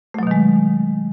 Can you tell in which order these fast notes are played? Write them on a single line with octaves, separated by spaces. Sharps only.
A3 F#3 B2 D#3 G#3